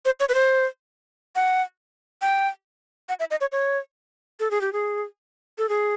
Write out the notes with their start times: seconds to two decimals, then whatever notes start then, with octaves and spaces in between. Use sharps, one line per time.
0.05 C5
0.20 C#5
0.29 B4
0.34 C5
1.36 F#5
2.22 G5
3.09 F#5
3.20 E5
3.31 D#5
3.41 C#5
3.52 C#5
4.40 A4
4.51 G#4
4.61 G4
4.73 G#4
5.58 A4
5.69 G#4